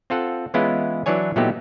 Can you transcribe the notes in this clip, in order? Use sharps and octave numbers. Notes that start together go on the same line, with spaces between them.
C4 F4 A4 F#5
E3 G#3 B3 C#4 E4 F4
E3 F#3 D4 C#5 G#5
A#2 F#3 A3 B3 D#4 G4